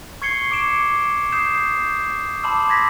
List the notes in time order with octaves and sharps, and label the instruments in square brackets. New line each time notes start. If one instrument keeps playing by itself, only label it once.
[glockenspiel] C#6 G#6 C7 C#7 G7
D6 C#7 D7 E7
D#6 G6 C7 E7
A5 B5 C6 D6 E6
G#6 A#6 B6